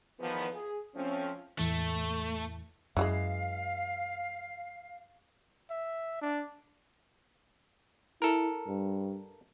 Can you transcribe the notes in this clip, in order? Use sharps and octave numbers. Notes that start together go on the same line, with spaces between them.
E2 D#3 F3 B3
G#4
F3 A3 C4 C#4
E2 A2 E3 A3
F#2 E3 G3 G#3 F5
E5
D4
E4 A4 A#4
G2